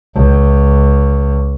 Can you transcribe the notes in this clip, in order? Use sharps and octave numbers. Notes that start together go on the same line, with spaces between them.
C#2